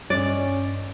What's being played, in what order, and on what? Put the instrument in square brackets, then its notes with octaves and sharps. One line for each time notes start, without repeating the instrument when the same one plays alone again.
[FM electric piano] G2 D#5 [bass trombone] C#4 [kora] D5